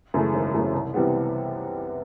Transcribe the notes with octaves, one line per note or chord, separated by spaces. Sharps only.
F#2 C#3 E3 A3
G#1
F#2 C#3 E3 A3
C2
C3 E3 G3 B3